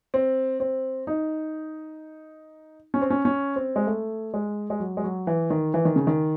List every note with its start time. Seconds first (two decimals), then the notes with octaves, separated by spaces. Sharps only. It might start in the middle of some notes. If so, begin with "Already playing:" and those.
0.14 C4
0.60 C4
1.07 D#4
2.94 C#4
3.01 C4
3.10 C#4
3.25 C#4
3.56 C4
3.76 G#3
3.87 A3
4.34 G#3
4.70 G#3
4.80 F#3
4.97 G#3
5.04 F#3
5.27 E3
5.50 D#3
5.74 E3
5.85 D#3
5.96 C#3
6.07 D#3